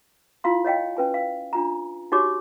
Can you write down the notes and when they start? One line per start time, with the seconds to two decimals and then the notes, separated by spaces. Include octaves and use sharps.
0.44 E4 F4 F5 C6
0.65 C#5 D#5 F5 G5
0.97 C#4 B4 G#5
1.14 F5
1.53 D4 F4 A#5
2.12 D#4 F#4 G4 C#5 D6